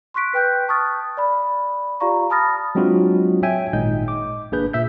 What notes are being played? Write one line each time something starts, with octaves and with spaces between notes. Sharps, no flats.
C6 C#6 F#6 B6 D7
B4 G5 F#6 G6
A5 C#6 D#6 F6 A6
D5 B5
F4 G4 D5 F5 A#5 C#6
A5 B5 D#6 F6 A6 A#6
F#3 G#3 C4 D4 F4 F#4
C#5 E5 G5 G#5
G#1 A#2 G#3 D#4 D#5 G6
D6
G1 A#3 D4 G#4 B4 G6
A#2 E5 G6